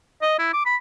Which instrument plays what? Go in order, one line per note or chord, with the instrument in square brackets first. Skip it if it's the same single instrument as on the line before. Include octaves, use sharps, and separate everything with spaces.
[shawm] D#5
E4
D6
B5